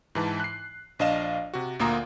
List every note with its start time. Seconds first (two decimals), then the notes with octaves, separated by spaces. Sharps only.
0.15 G#2 E3 A5
0.40 F#6 C7
0.99 A#1 D4 D#5 F5 E7
1.54 C3 F#4
1.79 D2 A#2 A#3 F4 A#5 D#6